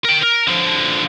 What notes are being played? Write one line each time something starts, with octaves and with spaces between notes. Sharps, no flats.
A#4 G5
A#4
D3 F3